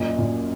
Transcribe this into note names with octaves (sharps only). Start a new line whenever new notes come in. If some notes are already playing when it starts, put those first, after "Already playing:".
Already playing: F#2 A#2 D#5
A#2